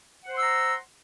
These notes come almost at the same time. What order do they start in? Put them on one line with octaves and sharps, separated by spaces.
F#5 C5 C6 E6 A#5